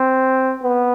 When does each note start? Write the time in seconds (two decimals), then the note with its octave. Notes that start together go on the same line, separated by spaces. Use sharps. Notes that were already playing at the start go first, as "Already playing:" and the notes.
Already playing: C4
0.63 B3